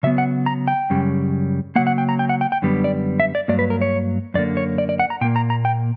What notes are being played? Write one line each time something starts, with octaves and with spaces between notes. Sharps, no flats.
C#3 F#3 B3 E5
F#5
A#5
G5
F#2 C#3 G3
C#3 F#3 A#3 F#5
F#5
G5
A#5
G5
F#5
G5
G5
F#2 D3 G3 B3
D5
E5
D5
G2 F#3 A#3 D5
B4
A#4
C#5
F#2 D3 A#3 D5
C#5
D5
D5
F#5
A#5
A#2 A#3 G5
A#5
A#5
G5